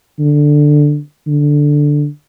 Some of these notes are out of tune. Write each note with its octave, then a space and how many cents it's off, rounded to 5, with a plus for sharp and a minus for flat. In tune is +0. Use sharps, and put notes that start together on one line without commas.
D3 +5
D3 +0